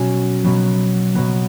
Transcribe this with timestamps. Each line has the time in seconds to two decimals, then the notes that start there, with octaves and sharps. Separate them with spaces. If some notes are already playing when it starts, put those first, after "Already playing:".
Already playing: B2 F#3 C#4 F#4
0.44 B2 F#3 B3
1.15 B2 F#3 B3